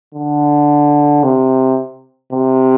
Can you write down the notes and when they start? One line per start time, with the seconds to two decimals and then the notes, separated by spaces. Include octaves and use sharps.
0.14 D3
1.23 C3
2.33 C3